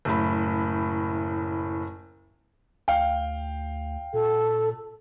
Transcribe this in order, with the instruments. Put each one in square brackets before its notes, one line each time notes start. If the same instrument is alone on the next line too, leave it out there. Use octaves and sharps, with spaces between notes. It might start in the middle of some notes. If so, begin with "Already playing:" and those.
[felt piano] F#1 A2 B5
[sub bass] D2 [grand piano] F5 G5
[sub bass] A#2 [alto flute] A4